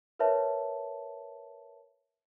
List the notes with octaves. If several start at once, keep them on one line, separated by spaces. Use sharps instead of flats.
A#4 B4 C#5 E5 A5